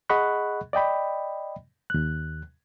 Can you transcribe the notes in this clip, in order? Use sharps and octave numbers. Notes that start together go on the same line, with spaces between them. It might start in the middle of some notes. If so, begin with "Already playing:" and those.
G#4 D#5 F#5 B5 C#6 F#6
D5 D#5 G5 B5
D#2 F#6